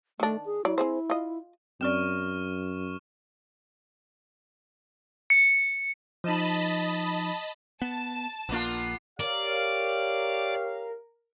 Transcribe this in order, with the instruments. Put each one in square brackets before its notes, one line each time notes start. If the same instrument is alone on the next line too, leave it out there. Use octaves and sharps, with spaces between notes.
[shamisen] D#3 D4 [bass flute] A3
[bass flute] G#4
[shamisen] F#3 D5 [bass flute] E4
[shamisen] C4 G#4 C5
F4 D#5
[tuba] F#2 [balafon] C4 D5 [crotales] C#6 F6 E7
[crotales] C#7
[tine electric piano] F3 D#4 [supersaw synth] D#5 A5 B5
[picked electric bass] B3 [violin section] A5
[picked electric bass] A#1 A#3 [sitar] B3 D4 F4
[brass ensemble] G4 C#5 F5 [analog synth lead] A#4 [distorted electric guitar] D5